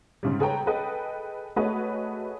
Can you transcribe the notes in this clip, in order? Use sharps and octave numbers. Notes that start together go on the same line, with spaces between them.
G#2 C#3 G3
G#4 A4 B4 C#5 G5 A#5
G#4 A4 B4 D#5 G5
A3 F#4 G#4 B4 C#5 D#5